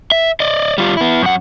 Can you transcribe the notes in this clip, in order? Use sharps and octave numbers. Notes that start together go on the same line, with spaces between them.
E5
D5 D#5
G3 F4
B3 E4
F#2 F#5